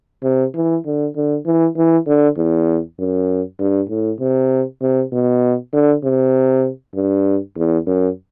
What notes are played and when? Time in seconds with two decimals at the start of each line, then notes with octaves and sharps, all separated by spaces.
0.23 C3
0.55 E3
0.86 D3
1.16 D3
1.46 E3
1.77 E3
2.07 D3
2.37 E2
2.99 F#2
3.60 G2
3.90 A2
4.20 C3
4.82 C3
5.13 B2
5.73 D3
6.04 C3
6.95 G2
7.56 E2
7.87 F#2